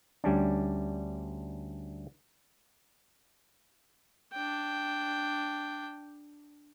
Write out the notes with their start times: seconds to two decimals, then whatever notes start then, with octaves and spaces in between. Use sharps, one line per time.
0.24 D2 G3 C#4 D4
4.33 D4 G5